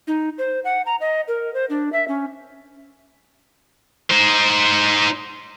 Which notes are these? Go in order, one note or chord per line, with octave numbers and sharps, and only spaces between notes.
D#4
C5
F#5
A#5
D#5
A#4
C5
D4
E5
C#4
D#4 C5